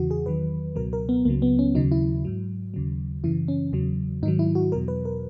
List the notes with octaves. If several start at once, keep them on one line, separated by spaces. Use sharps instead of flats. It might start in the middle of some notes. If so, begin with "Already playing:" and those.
Already playing: E2 C#3 E3 F#4
G#4
E2 D#3 F#3 B4
C#2 B2 F#3 A#4
A#4
B3
C#2 C#3 F#3 A#3
B3
C#4
D#2 C#3 F#3 D#4
E4
G#2 F#3
D#2 C#3 F#3
F#2 C#3 E3 E4
C#4
E2 C#3 F#3
G#2 D#3 F#3 D#4
E4
F#4
E2 B2 F#3 A#4
B4
A#4